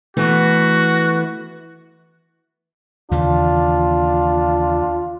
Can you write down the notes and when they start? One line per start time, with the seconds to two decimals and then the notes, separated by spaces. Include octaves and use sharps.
0.17 E3 A3 B3 F#4
3.11 D#2 C#3 E3 D4 F4